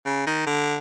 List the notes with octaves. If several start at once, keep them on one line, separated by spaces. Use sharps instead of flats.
C#3
D#3
D3